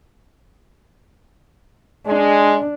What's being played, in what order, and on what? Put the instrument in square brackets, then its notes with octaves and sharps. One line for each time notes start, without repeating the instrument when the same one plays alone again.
[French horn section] G#3 [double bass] D4